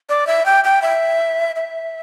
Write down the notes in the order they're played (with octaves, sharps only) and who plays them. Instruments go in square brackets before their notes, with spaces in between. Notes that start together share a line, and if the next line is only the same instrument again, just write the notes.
[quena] D5
E5
G5
G5
E5
E5